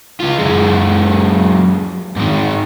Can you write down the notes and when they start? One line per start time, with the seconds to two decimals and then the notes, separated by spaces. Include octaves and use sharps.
0.21 C#2 F4
0.39 F#2 G#3
2.17 G#2 D#3